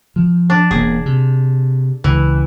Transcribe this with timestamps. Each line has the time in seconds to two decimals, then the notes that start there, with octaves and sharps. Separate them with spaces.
0.16 F3
0.50 D4
0.71 E1 A#3 G#4
1.06 C3
2.04 C#2 E3